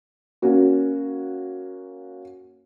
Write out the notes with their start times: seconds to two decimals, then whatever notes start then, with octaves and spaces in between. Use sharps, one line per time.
0.42 A#3 C#4 F#4